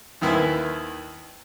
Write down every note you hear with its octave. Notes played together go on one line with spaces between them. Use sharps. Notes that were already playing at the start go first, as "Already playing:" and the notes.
D#2 D#3 E4 B4 C5 G#5